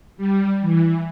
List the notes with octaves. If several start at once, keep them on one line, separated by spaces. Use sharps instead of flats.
G3
E3